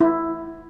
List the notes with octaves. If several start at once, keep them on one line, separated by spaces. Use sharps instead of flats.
E4